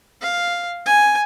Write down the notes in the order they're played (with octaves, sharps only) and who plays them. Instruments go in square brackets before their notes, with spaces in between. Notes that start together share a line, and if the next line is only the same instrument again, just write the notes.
[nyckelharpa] F5
G#5